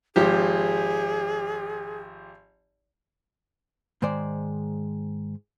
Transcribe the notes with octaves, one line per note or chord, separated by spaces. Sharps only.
G#1 F3 G4 G#4
G#2 D#3 G#3 C5 D5